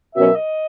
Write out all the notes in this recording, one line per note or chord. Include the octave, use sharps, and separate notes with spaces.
B2 F#3 C#4 F#4 A#4 E5
D#5